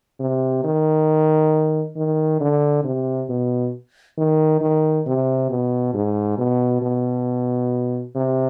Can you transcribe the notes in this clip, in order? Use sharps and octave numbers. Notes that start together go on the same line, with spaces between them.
C3
D#3
D#3
D3
C3
B2
D#3
D#3
C3
B2
G#2
B2
B2
C3